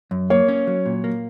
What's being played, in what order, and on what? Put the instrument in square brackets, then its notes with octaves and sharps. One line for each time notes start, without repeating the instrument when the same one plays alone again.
[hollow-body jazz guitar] F#2
[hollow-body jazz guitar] A#3 [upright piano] C#5
[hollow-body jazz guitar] C#4
F#3
A#2
A#3